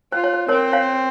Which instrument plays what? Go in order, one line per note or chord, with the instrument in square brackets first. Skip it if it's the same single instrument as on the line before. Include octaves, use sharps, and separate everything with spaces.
[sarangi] F4 [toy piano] C5
[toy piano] C#5
C5
[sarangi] C4 [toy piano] A#4 C#5
[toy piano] C#5 F5